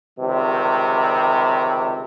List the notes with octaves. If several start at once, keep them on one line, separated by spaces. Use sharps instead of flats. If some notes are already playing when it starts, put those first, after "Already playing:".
C#2 C3 D#3 G3